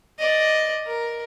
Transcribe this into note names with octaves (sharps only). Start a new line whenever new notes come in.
D5 D#5
A#4